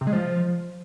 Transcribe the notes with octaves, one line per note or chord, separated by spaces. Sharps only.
C3
G#3
F3